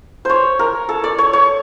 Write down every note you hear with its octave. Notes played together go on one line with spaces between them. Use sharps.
C5 C#5
A#4
A4
D5
C#5
C#5